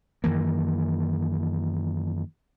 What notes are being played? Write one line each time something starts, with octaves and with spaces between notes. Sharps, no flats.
F#2 D#3 E3 A#3